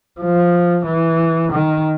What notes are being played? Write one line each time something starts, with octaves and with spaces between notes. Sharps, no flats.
F3
E3
D#3